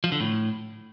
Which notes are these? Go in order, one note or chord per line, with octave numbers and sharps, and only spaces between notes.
F3
D3
A2